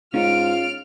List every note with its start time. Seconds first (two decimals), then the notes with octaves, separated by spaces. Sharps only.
0.14 G#2 C#4 D#4 F4 C#5 F6 D7